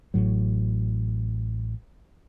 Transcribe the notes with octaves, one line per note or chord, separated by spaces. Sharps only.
A1 A2 F#3